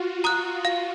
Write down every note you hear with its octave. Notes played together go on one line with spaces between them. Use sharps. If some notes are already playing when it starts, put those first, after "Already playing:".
Already playing: F4 F#4
A#5 D#6 F#6
F5